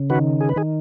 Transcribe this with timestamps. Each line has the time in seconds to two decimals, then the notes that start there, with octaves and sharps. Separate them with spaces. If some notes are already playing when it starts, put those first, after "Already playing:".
Already playing: C#3
0.10 D#3 F#4 B4
0.41 G#4
0.49 B4
0.56 D#3 G#4